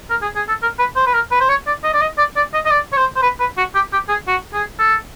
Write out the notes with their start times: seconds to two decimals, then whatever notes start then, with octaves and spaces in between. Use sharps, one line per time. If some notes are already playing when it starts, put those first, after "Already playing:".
0.10 A#4
0.22 G#4
0.36 G#4
0.48 A4
0.62 A#4
0.79 B4
0.96 C5
1.06 B4
1.14 A#4
1.31 B4
1.40 C5
1.49 C#5
1.67 D5
1.84 D#5
1.94 D5
2.01 D#5
2.18 D5
2.36 D5
2.54 D#5
2.65 D#5
2.70 D5
2.93 C#5
2.97 C5
3.16 C5
3.22 B4
3.39 B4
3.57 F#4
3.75 G4
3.93 G4
4.09 G#4
4.27 F#4
4.54 G#4
4.79 A4